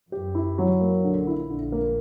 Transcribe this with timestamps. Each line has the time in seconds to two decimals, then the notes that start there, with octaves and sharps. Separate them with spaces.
0.12 F#2 G4
0.35 E4
0.58 F#3
0.81 A#3
1.04 A#1 A#2 D3
1.27 E4
1.49 A#1 A#2 D3
1.72 A#3